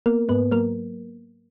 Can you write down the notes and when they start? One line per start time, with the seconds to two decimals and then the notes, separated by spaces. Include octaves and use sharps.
0.06 A#3 B3 A#4
0.29 G#2 B3 B4
0.51 F#3 A#3 A#4